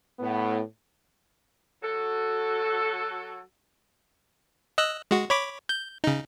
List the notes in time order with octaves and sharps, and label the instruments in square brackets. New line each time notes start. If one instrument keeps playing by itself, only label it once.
[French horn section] A2 B3
[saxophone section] F#3 F#4 A4
[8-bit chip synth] D#5 E6 F#6
G#3 F#4
C#5 B5 D6
G6
C#3 D#4